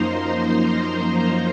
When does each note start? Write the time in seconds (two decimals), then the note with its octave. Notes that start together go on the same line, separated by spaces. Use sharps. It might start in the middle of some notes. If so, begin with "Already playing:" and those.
Already playing: F#2 F3 A#3 D#4 C5 A#5 C6
0.66 A#5